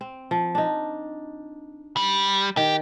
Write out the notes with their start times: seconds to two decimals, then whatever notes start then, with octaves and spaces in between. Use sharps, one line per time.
0.01 C4
0.31 F3
0.55 D4 D#4
1.97 G3
2.57 D#3 G4